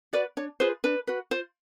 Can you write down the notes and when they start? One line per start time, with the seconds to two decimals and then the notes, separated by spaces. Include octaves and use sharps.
0.13 F#4 B4 D5
0.37 D4 C#5
0.60 F4 G#4 B4 C5
0.84 D4 B4
1.07 F#4 B4
1.31 F4 C5